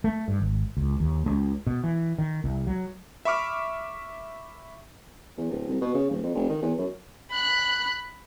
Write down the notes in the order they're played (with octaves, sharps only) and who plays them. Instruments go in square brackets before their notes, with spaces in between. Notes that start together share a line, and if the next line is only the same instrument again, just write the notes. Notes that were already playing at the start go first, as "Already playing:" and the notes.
[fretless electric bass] A3
G2
G#1
C#2
D#2
C#2
B2
E3
D#3
C2
F#3
[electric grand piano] E5 B5 C#6 D6 F6
[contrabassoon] E2
D1
C2
B2
C#3
D#1
F2
F1
D#3
E2
F#2
[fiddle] B5 F#6